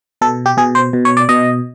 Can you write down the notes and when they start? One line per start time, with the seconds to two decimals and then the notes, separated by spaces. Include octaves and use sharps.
0.21 B2 A4
0.46 G4
0.57 B2 G#4
0.75 C5
0.93 B2
1.05 C#5
1.17 D5
1.29 B2 D#5